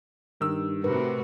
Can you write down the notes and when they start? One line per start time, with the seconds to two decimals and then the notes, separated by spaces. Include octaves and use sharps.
0.41 G2 D#3 E6
0.84 A2 C3 F#4 A#4 B4